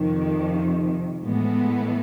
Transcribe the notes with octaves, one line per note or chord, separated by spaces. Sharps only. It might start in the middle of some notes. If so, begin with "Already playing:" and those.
Already playing: F2 C3 D#3
A2 E3 G#3 B3